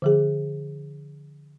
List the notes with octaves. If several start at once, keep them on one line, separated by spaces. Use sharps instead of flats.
D3 F3 G#4